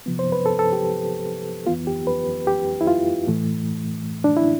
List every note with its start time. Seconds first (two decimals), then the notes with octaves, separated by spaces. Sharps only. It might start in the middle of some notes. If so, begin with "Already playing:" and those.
0.06 C3 F3 B3
0.19 C5
0.32 B4
0.46 A4
0.59 A4
0.73 G4
1.67 F2 E3 B3 F4
1.87 G4
2.07 B4
2.47 G4
2.81 E4
2.87 F4
3.27 A2 E3 A3
4.24 D4
4.37 E4